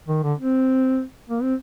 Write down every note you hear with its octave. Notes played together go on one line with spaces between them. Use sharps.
D#3
D3
C4
A#3
C4